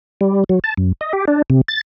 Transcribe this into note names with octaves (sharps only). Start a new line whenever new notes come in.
G3
F#3
A5
F#2
D#5
G4
D4
C3
A6